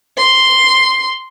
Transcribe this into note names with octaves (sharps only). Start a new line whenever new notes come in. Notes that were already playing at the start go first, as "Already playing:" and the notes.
C6